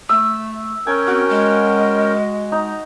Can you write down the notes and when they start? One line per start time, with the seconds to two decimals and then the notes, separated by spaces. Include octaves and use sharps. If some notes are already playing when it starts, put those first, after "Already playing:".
0.09 A3 E6
0.87 C#4 A#4 G5 G#5
1.07 C4 F#4
1.30 G#3
2.52 D#4 A#5